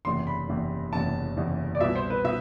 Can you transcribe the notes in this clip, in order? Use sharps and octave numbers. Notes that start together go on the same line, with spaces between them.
F#1 E2 C3 C6
B5
F#1 E2 C3
F#1 E2 C3 A5
F#1 E2 C3
D5
C2 B2 E5
C5
B4
B2 E5